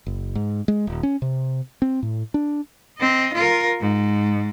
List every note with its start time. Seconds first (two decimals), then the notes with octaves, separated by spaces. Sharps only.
0.06 F#1
0.35 G#2
0.68 G#3
0.87 D#1
1.03 C#4
1.22 C3
1.82 C4
2.02 A2
2.34 D4
2.98 C4 D#5
3.33 F4 A#4
3.80 G#2